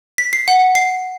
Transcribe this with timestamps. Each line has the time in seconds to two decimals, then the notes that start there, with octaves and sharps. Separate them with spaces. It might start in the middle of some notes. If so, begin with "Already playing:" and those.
0.18 B6
0.33 C7
0.48 F#5
0.75 C7